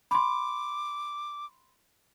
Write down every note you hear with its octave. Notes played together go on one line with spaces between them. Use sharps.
B5 C6 D6